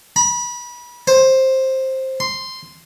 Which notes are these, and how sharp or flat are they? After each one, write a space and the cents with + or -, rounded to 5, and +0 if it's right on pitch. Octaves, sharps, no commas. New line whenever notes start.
B5 -30
C5 +10
C6 -5